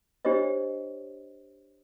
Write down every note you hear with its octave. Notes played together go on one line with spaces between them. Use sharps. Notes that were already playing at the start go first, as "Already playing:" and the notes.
D4 G4 C5 C#5 D#5